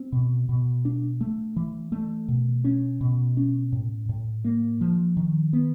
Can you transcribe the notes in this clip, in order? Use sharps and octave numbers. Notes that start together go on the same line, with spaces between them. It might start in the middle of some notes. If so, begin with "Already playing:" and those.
Already playing: C4
B2
B2
D4
A3
E3
A3
B2
C#4
B2
C#4
A2
A2
A#3
F3
D#3
B3